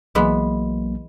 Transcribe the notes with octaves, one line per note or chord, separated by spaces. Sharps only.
B1 E3 F#3 G#3 A#3 B3